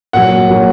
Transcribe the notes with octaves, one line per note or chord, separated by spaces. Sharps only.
A#2 F#3 F#5
A#2 F#3